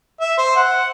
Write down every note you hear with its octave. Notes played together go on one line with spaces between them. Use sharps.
E5
C5
F#5